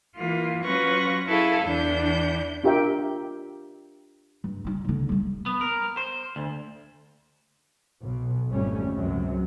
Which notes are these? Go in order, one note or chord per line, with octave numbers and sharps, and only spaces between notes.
E3 A#3 F4
F#3 C#4 F4 B4 C#6 A#6
E4 G#4 A4 F5
E2 E3 D4 G6
D4 F4 G4 A#4 E5 G5
G2
G3 D#4
C2 D3
G3 A3
B3
A#4
C5
D2
B1 B2
G#1 F2 G3 A3 C#4
C#2 F#2 C3 F#3